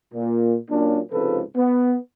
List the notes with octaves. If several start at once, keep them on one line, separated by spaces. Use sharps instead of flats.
A#2
A#2 F#3 A#3 C#4 D4
C#2 G#2 C3 F3 A4 B4
B3